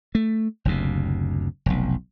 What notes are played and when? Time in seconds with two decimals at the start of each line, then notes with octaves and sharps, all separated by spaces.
0.15 A3
0.65 F#1 D2 C3
1.66 F1 B1